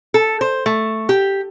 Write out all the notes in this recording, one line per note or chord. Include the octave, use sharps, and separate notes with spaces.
A4
C5
A3
G4